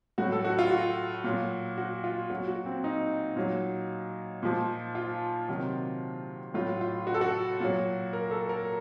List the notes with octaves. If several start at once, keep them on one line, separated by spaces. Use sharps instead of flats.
A2 F#3 F#4
A4
F#4
F4
F#4
A#2 F#3
F#4
F4
A#2 F#3 F#4
F#4
C4
D#4
A#2 F#3
A#2 F3
F4
C3 D#3 F#3
A2 F#3 F4
F4
F#4
A4
F#4
A#2 F#3
A#4
A4
A#4